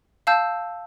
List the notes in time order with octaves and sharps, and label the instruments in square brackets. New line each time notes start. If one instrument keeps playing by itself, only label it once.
[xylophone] F5 A5 E6 G6